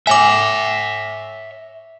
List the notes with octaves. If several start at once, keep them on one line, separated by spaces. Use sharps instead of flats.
C#5 E5 G#5 D6